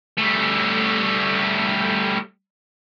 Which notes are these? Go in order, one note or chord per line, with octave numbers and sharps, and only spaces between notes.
G3 A3